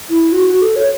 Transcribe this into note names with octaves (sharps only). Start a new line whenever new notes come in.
E4
F#4
F#4
A4
C#5